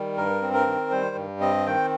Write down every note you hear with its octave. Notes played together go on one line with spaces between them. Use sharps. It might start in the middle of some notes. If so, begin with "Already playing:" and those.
Already playing: D#3 G3
G2 A#4
C4
A#4
D#3
G3 C5
G2
C4 D#5
D#3 G5